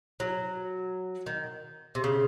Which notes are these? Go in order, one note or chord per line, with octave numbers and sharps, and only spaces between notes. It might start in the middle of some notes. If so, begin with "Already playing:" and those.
F#3
D#3
C3
C#3